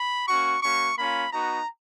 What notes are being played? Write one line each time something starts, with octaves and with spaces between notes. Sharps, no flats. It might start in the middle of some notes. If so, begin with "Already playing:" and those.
Already playing: B5
A#3 C#4 F#4 C#6
A#3 C#4 F#4 C#6
A#3 C#4 F4 B5
B3 D#4 F#4 A#5